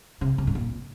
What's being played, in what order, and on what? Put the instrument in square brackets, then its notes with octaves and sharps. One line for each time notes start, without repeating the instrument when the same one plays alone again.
[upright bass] C3
C3
G#2
A#2